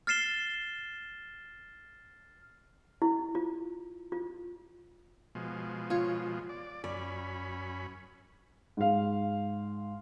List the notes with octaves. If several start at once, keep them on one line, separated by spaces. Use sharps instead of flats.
F6 A6 C7 E7 G7
E4
F4
F4
B2 F3 G#3
F4 C#5
D5
F#2 C#4 D5 B5
G#2 F5